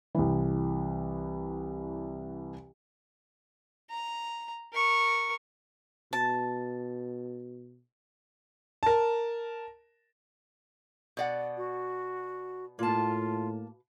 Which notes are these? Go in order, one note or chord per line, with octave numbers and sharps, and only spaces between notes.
C2 E3
A#5
A#4 C#6
B2 A5
A#4 A5
B2 D5 F#5
F#4
A2 A#3 F4 A5